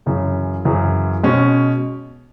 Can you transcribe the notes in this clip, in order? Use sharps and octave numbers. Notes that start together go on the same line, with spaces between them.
F#2 C#3 E3
F#2 C#3 E3
B2 G#3 C#4